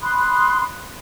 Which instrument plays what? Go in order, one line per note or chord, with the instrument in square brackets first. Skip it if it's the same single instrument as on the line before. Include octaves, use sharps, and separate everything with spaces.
[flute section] B5 C6 D#6 F#6